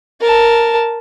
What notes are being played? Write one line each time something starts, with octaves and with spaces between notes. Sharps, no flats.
A#4 A5